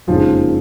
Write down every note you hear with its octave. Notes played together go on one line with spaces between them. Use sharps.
F#1 F2 D#3 F3 G#3 C#4 F4